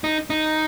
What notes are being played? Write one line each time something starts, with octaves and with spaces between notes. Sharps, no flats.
D#4
D#4